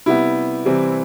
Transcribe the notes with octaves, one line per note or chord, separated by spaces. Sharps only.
C3 G3 B3 E4
C3 E3 G3 C4